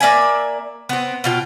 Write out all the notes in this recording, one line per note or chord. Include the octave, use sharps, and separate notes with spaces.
A#3 D5 E5 G#5
B3 C4
B2 F4 G5